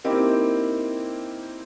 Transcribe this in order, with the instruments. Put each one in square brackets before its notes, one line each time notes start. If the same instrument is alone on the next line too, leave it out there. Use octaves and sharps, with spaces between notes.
[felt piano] A#3 C4 D#4 E4 G4